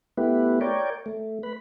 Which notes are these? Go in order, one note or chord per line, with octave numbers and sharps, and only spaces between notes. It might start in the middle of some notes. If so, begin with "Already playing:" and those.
A3 B3 E4 G4 B4
A#4 C#5 D5 G5
A3
B4 B5